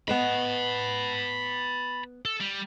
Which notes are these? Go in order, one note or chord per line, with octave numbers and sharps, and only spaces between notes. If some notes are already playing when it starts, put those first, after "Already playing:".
B3 B4 D#5 A5 B5
A4
G3